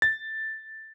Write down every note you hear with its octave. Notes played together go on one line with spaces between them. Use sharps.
A6